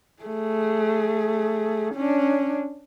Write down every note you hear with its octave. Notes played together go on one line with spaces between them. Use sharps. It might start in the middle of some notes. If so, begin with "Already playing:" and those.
A3 G#4
C#4 D4